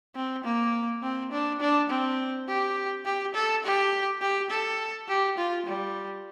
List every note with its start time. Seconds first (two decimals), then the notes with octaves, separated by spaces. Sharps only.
0.16 C4
0.45 A#3
1.03 C4
1.32 D4
1.60 D4
1.90 C4
2.48 G4
3.05 G4
3.35 A4
3.64 G4
4.21 G4
4.50 A4
5.08 G4
5.38 F4
5.67 G3